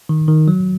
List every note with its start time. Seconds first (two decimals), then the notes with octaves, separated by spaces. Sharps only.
0.09 D#3
0.28 D#3
0.48 F#3